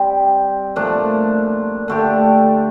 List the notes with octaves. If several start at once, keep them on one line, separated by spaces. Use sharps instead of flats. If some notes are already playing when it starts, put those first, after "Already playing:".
Already playing: G3 C4 G4
A#2 F3 A3 D4
D3 A3 D4 G4